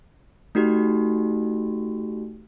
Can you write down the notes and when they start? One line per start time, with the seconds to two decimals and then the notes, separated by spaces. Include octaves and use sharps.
0.55 A3 D#4 F#4 G4